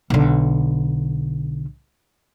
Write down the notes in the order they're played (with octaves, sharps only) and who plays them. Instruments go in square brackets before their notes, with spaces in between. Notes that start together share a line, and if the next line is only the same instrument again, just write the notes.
[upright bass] B1 D3